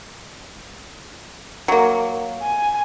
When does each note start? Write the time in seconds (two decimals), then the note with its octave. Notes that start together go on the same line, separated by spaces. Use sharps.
1.68 F#3 A#3
2.42 G#5